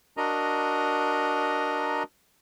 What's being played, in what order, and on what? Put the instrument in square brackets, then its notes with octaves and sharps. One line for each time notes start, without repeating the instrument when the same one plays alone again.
[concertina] D4 F#4 A#4 D#5 A#5